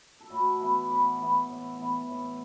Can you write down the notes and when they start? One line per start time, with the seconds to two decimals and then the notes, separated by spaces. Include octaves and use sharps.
0.20 A4
0.30 A2 F#4 B4
0.60 E3 B3
0.84 D6
0.89 A2 F#5 B5
1.20 E3 B3
1.49 A2
1.79 E3 B3
2.08 A2